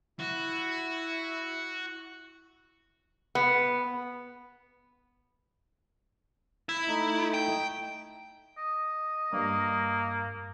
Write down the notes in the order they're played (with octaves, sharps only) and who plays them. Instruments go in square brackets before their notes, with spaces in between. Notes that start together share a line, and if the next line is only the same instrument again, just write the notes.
[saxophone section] E4 [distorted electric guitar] F#4
[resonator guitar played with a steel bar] B3
[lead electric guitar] E4
[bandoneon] A3 D#4
[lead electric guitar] G5
[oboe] D#5
[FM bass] G2 [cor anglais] A#3